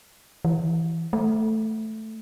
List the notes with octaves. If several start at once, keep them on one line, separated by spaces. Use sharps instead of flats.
E3
A3